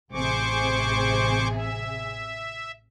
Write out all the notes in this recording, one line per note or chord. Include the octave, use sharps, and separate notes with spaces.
A1 C3 G#4 C5 C#6 D6
E5